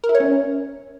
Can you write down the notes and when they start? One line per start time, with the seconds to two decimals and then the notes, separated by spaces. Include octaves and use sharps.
0.04 A#4
0.09 E4
0.15 C#5
0.20 C#4